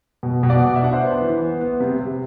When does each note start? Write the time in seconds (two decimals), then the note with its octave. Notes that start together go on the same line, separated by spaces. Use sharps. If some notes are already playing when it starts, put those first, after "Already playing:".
0.23 B2
0.43 B2
0.49 D5 F#5
0.62 B2
0.76 E5
0.82 D4 F#5
0.93 C5 E5
1.02 B3
1.22 E3
1.41 B3
1.61 B3
1.80 C3
2.00 C3